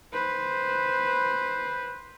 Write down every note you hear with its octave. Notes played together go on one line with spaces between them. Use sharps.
B4 C5